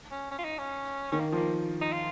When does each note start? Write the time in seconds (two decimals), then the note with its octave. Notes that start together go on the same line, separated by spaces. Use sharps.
0.11 C#4
0.31 C#4
0.39 F4
0.45 D#4
0.58 C#4
1.12 D#3 C#4
1.20 A#3
1.32 F3 A#3
1.81 D#4
1.93 F4